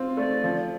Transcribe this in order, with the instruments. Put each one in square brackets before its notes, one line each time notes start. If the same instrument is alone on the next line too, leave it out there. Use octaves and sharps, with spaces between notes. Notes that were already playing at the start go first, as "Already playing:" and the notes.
Already playing: [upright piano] C4 F4
[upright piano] A3 [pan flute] D5
[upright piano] F3